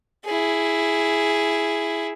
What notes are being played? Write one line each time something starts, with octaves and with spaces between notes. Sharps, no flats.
E4 G#4